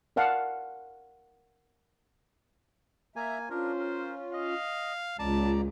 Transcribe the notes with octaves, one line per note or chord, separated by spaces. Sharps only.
A#4 D5 F5 F#5 A5
A#3 E5 G#5 A#5
C#4 D4 F4 A#4 C5
A#4
D#5 F5
C#2 A#2 D5 A5 A#5